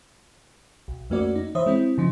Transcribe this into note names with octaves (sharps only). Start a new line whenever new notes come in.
B1
F2 A3 A#3 C#4 F#4 D5
D#4
E3 C5 C#5 E5 D#6
G#3 C4 E4
C#3 F3 D#4